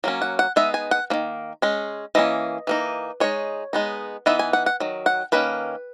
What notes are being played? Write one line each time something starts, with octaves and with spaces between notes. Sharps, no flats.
F#3 A#3 C#4
F#5
F#5
G#3 B3 D#4 E5
G#5
F#5
D#3 F#3 A#3
G#3 C#4
E3 A#3 C#4 D#5
E3 A#3 D#4
G#3 D#4 C#5
G#3 B3 D#4
E3 B3 D#4 E5
G#5
F#5
F#5
D#3 F#3
F#5
D#3 A#3 C#4 B4